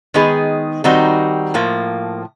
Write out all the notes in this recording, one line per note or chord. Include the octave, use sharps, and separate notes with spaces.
D#3 G#3 B3 D#4 G#4
D#3 G3 C4 D#4 F#4
A2 F3 A#3